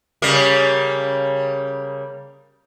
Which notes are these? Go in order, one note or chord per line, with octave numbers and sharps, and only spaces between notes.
C#3 G3 A#3